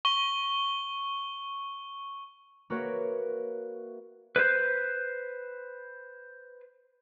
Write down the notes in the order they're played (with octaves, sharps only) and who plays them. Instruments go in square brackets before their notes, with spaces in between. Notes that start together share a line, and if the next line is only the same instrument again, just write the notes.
[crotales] C#6 G7
[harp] A#3 F#4 A#4 B4 C#5 E5
[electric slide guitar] B4 C5